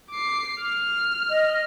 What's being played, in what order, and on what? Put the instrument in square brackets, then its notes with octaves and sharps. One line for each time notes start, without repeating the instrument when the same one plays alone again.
[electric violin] D6 C7
F6
[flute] D#5